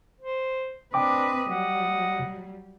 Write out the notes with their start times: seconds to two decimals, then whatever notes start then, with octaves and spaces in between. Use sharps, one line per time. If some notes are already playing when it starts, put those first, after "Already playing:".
0.21 C5
0.94 C4 D4 B4 D#5 G5 D6
1.50 F#3 G3 F#5